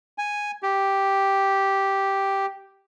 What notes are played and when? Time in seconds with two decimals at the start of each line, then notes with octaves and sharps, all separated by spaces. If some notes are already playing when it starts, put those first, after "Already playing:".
0.18 G#5
0.63 G4